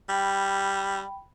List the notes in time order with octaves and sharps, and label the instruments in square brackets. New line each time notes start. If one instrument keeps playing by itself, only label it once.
[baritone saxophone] G3 [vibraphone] G5 B5